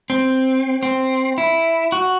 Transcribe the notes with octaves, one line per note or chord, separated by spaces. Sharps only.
C4
C4
E4
F#4